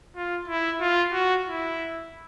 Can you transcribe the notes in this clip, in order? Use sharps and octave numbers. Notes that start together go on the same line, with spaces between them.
F4
E4
F4
F#4
E4